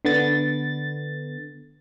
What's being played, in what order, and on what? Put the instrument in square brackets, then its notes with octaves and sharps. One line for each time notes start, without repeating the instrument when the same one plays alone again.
[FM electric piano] D3 B3 A6